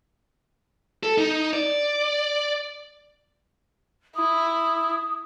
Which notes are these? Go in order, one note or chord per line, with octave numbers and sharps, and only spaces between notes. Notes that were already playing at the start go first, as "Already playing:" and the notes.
A4
D#4
D5
E4 D#6